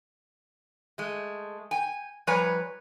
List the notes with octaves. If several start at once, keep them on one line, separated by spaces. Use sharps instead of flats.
G#3 A3
G5 G#5
F3 G3 B4 C#5 G#5 A#5